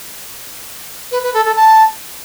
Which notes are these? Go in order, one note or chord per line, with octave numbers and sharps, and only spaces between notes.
B4
B4
A4
A4
A5